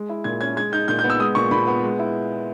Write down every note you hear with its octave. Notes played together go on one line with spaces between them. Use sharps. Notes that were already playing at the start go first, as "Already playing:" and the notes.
Already playing: G#3
E4
A#2 G#6
C#4 G#6
G#3 G#6
D#4 G6
A#2 G6
G6
B3
E6
G#3 D#6
A#2 C#6
A#2 B5
B3
G#3
E4